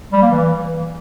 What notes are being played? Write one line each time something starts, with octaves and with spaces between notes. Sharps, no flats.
G3
A#3
E3